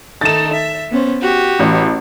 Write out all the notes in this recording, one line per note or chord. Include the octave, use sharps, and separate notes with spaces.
D#3 A3 D#4 A6 E7
E5
B3 C#4 C5
F#4 G4
A1